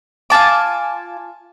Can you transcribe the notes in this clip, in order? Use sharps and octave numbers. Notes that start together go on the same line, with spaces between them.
F4 G#5 A5 D6